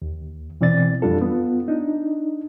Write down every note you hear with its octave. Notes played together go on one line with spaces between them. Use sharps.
D#2
B2 E3 C4 D5 A6
F2 G3 D4 F4 A4
B3 F4
D4 D#4